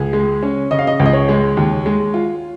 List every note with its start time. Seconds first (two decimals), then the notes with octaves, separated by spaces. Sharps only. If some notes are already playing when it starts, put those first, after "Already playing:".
Already playing: C#2 G#4
0.13 G#3
0.43 C#4
0.71 C#3 D#5
0.79 F5
0.87 D#5
1.00 C#2
1.06 D#5
1.13 C#5
1.29 G#3
1.57 D#2
1.86 G#3
2.14 F4